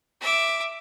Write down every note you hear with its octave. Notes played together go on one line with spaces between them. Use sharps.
E5 D6